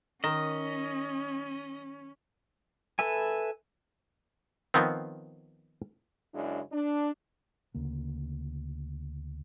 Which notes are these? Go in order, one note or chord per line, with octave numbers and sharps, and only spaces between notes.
D#3 C#4 D#5
A4 B4 E5 G#5
D#3 F3 B3 C4
F#2 C#3 G#3 D4 E4
D4
D2 C#3 A#3